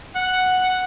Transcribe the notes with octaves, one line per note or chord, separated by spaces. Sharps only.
F#5